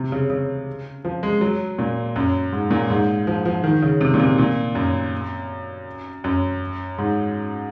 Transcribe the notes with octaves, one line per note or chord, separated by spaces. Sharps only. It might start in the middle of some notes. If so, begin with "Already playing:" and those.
Already playing: C3
C#3
C#3
F3
G#3
F#3
A#2
F#2
G#2
A#2
G#2
F3
F3
D#3
C#3
C3
A#2
C3
A#2
F#2
F#2
G#2